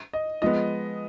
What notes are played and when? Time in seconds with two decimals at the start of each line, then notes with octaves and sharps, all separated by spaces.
0.13 D#5
0.42 F3 G#3 B3 D#5